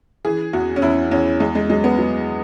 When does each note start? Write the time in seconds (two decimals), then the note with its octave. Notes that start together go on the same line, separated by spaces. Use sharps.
0.25 E3 G#4
0.53 E2 F#4
0.76 C#4
0.82 E2 E4
1.11 E2 C#4
1.40 E2 G#3
1.55 G#3
1.70 F#3 G#3
1.84 B3
1.99 F#3